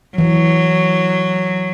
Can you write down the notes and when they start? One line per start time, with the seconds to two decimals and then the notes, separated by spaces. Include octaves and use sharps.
0.17 E3 F#3